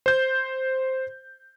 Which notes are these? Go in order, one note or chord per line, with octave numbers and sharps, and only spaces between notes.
C5 G6